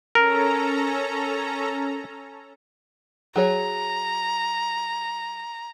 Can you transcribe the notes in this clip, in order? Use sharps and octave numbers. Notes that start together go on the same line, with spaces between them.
C#4 A4 A#4 A#5
F#3 G#4 C#5 A#5